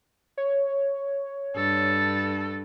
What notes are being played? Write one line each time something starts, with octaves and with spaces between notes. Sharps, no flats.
C#5
G2 A4